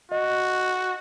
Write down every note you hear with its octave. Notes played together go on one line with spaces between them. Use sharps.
F#4 D#5